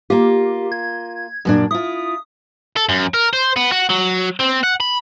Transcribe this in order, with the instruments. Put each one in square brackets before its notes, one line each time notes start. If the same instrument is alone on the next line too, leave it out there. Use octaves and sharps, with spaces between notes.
[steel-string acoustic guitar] A#3 F4 [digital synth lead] G4
[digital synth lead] G#6
[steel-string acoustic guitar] F#2 A#2 D4
[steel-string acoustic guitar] E4 F4 [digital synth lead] D#6
[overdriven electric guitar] A4
F#2
A#4
C5
B3
F#4
F#3
C4
F#5
B5